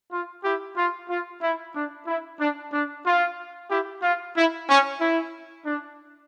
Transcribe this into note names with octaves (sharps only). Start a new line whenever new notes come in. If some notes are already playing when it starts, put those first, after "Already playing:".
F4
E4 G4
F4
F4
E4
D4
E4
D4
D4
F4
E4 G4
F4
E4
C#4
E4
D4